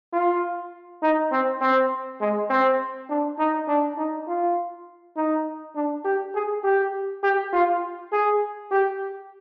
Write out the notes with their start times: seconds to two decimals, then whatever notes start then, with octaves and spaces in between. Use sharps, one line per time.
0.13 F4
1.02 D#4
1.31 C4
1.61 C4
2.20 G#3
2.50 C4
3.09 D4
3.39 D#4
3.68 D4
3.98 D#4
4.28 F4
5.17 D#4
5.75 D4
6.05 G4
6.35 G#4
6.64 G4
7.23 G4
7.53 F4
8.12 G#4
8.71 G4